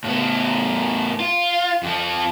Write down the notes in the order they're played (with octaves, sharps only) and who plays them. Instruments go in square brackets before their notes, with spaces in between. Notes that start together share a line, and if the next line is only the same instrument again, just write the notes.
[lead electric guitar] A2 B3
F4
F2 F3